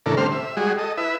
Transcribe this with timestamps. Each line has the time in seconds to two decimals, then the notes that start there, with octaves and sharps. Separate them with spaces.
0.06 A2 C#3 E3 D4 A4 A#4
0.17 D3 G3 A3 C4 C5 F6
0.32 E5
0.57 G3 G#3 F#4 G#4
0.79 A4 D#5
0.97 E4 B4 E5